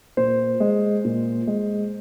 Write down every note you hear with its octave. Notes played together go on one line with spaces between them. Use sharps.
A#2 C5
G#3
A#2
G#3